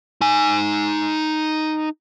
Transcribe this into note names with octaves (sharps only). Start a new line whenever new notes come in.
D#4 G#5